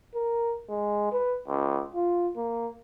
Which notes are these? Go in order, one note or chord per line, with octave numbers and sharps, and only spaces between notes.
A#4
G#3
B4
C#2
F4
A#3